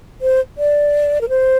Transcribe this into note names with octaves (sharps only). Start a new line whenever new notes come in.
C5
D5
A#4
C5